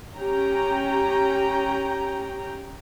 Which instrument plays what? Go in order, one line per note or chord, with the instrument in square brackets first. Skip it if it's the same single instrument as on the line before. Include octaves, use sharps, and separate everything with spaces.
[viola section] C#4 G4 G5 A#5